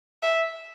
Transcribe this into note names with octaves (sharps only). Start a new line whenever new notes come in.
E5